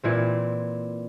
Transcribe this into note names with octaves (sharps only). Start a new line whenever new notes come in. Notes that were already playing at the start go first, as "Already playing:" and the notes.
A#2 E3 C4